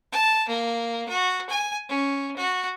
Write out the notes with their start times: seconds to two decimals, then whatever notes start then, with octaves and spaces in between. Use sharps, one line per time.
0.12 A5
0.48 A#3
1.08 F#4
1.50 G#5
1.89 C#4
2.36 F#4